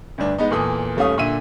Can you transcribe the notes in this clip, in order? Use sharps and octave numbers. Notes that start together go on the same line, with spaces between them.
D2 G2 D4
G#3 B3 D#4
E2 A#2 A4 D#6
D#1 A3 C#4 F5 D#6
A#2 D3 E5 D#7